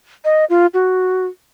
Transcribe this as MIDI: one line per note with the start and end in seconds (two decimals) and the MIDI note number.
0.25 0.45 75
0.50 0.67 65
0.74 1.27 66